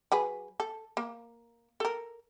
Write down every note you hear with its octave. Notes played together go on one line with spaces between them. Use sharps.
F#3 G#4 B4
A4
A#3
A4 A#4